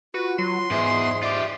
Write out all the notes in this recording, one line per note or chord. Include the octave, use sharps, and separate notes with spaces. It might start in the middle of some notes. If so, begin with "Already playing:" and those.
F4 F#4 B4
F#3 C6
E2 G#2 G#4 E5
F4 G4 D5